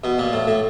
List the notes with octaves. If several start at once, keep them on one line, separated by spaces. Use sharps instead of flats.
B2
A#2
A2
A2